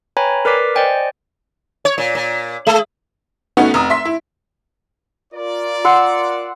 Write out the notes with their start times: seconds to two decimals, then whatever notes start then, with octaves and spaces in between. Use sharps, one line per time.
0.17 B4 C#5 G5 G#5 A#5 B5
0.45 A#4 B4 D5 D6 B6 C7
0.75 C5 D5 D#5 G5 G#5
1.85 C#5
1.98 A#2
2.15 A#2
2.67 G#3
3.57 A3 B3 C#4 D#4 F#4
3.74 F1 A#5 D#6
3.90 E5 C6 B6
4.05 E4
5.33 F4 A#4 D5
5.85 F#5 C6 E6